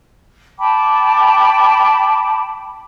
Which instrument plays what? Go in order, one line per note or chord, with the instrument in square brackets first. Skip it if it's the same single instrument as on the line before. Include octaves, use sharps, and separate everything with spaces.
[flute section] G5 A5 B5 D6